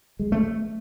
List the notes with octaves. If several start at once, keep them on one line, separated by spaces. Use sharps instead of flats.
G#3
A3